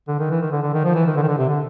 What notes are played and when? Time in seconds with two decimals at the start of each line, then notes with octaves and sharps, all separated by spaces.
0.08 D3
0.19 D#3
0.30 E3
0.42 D#3
0.52 D3
0.62 D3
0.74 D#3
0.84 F3
0.94 E3
1.07 D#3
1.17 D3
1.23 D#3
1.28 D3
1.38 C3
1.49 D3